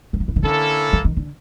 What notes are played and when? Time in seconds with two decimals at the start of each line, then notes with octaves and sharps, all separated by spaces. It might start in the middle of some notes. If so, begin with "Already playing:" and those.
0.13 F#3
0.20 F3
0.28 E3
0.36 D#3
0.43 D3 A#3 C#4 E4 A4
0.93 E3
1.04 D#3
1.17 D3